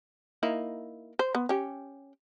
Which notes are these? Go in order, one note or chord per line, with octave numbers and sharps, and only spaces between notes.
A#3 D#4 E4
C5
B3
C#4 G4